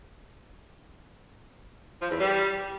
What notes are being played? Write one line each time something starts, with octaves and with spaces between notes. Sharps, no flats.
F3
E2
G3